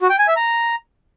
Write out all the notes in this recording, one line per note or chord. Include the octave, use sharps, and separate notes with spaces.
F#4
G5
G#5
E5
A#5